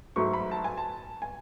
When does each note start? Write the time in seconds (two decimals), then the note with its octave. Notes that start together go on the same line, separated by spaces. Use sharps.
0.16 G#2 F#3 A3 C#6
0.33 B5
0.51 A5
0.64 G#5
0.77 A5
1.22 G#5